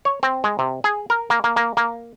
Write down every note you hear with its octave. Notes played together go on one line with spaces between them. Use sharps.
C#5
C4
G#3
C3
G#4
A#4
A#3
A#3
A#3
A#3